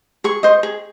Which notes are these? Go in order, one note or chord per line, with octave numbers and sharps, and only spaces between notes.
G#4 C#6
C5 D#5
G#4